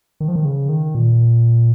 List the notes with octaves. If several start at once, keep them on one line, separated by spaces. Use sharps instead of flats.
D#3
F3
D#3
C#3
D#3
A#2